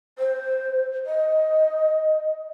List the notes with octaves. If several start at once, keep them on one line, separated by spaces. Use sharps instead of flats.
C5
D#5